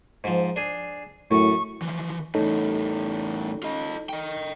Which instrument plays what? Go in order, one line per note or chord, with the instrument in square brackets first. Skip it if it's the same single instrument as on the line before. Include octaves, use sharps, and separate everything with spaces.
[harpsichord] G#2 F3
D4 G#4
[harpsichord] F#2 [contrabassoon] A2 [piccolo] C#6
[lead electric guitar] E3 F3
[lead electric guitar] E2 A2 [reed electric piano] D#4 A4 C#5
[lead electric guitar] F4 D#5
D#5 G5